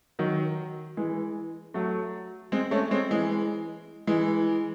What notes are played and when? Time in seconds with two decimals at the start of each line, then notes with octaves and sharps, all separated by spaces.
0.19 D#3 F#3
0.97 E3 G#3
1.74 F#3 A3
2.52 G#3 C4
2.71 A3 C#4
2.91 G#3 C4
3.11 E3 G#3
4.07 E3 G#3